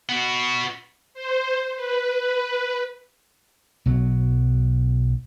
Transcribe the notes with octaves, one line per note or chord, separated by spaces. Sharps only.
B3 F#4
C5
B4
B4
B1 F#3